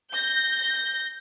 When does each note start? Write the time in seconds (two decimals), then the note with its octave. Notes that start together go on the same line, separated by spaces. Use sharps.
0.12 G6 A#6